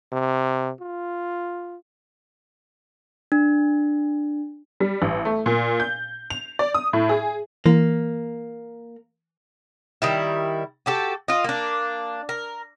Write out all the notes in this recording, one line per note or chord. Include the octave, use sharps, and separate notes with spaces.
C3
F4
D4
G3
A1
A3
A#2
G6
F7
D5
D#6
A2
G#4
E3 A#3
D#3 G3 E4
F#4 G4 A4
F4 D#5
A#3 D4
A#4